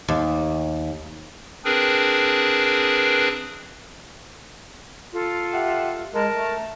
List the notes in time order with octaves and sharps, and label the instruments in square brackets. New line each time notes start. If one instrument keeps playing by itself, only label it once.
[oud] D#2
[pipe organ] C4 D4 G#4 A#4 B4
[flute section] F4 A4
[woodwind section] G4 E5 F#5
[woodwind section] G#3 [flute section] A#4 A5
[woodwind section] A3